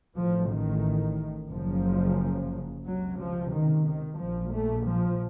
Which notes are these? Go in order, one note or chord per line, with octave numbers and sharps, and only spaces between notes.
A1 A2 F3
D#3
F#1 F#2 C#3 F3
C#2 C3 F#3
F3
D#3
D#3
A#1 A#2 F3
A3
F3